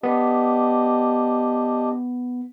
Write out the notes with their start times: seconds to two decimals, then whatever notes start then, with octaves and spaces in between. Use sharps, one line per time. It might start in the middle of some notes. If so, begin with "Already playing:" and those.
0.03 B3 D4 G4 D#5